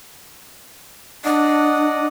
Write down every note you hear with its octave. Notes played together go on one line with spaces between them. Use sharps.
D4 D5 D#5 F#5